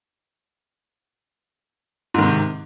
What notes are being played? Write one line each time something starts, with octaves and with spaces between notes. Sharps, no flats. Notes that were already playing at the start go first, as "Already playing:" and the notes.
G#2 C3 D#3